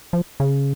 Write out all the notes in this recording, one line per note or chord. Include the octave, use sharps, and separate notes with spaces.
F3
C#3